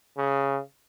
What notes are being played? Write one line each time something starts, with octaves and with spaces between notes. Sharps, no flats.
C#3